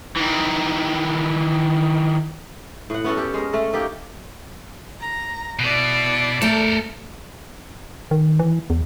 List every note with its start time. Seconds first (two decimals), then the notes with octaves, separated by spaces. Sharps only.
0.17 D#3 E3
2.90 A2 F#5
3.04 B3 C#4 F#4 A4
3.17 G4 A4
3.34 G#3 A#4
3.53 A3 A4
3.73 A#3 D#4 G4 A4
5.00 A#5
5.59 B2 E4 D5
6.42 A3 A4 A#4 A5
8.11 D#3
8.39 E3
8.70 E2